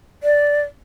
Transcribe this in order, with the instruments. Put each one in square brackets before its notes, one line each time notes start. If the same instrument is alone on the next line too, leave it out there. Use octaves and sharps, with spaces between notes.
[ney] D5